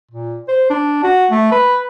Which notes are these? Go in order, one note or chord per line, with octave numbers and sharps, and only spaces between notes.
A#2
C5
D4
F#4
A3
B4